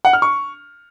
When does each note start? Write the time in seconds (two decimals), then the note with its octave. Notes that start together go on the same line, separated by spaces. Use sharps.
0.05 F#5
0.13 F6
0.22 C#6